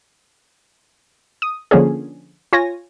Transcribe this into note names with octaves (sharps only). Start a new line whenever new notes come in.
D#6
D3 F3 A#3 C#4 G#4
F4 C#5 G#5 A#6